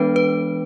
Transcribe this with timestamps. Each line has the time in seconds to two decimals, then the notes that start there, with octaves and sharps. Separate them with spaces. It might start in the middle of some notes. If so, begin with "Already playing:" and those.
Already playing: E3 G#3 B3 D4 B4
0.16 B4